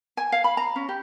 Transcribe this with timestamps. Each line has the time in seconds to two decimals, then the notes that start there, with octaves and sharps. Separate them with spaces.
0.17 G#5
0.32 F5
0.44 B5
0.57 A#5
0.76 C#4
0.89 G4